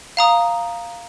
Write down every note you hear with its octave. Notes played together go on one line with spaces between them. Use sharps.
F5 A#5 D#6